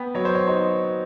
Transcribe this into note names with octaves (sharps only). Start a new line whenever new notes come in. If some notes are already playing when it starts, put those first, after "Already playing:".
Already playing: B3 G5
F#3 C#5
C5
C#5
D#4 C5